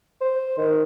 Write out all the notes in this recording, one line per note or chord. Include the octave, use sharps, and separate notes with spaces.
C5
D#3